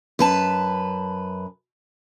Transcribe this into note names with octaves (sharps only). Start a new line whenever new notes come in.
F#2 B4 A5